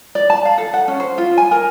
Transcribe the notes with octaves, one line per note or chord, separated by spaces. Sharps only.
D5
A5
F5
A4
F#5
C#4
C5
F4
G#5
A#4